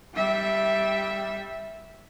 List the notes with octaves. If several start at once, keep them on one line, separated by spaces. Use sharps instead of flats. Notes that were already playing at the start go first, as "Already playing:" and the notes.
G3 E5